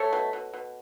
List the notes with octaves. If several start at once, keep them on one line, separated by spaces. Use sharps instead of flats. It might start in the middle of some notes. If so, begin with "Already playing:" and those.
Already playing: A3 A4 C#5
B2
B2
B2